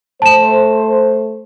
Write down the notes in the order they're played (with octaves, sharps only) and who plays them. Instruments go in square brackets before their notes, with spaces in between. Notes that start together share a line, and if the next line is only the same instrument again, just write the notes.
[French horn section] A3 C5 [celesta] A5 E7